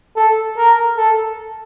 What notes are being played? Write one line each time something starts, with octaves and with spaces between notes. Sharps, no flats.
A4
A#4
A4